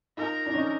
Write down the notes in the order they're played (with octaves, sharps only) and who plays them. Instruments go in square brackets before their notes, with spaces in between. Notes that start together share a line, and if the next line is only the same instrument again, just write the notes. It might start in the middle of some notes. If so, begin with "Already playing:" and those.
[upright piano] D#4 F4 [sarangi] A#4
[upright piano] D4
C#4 D#4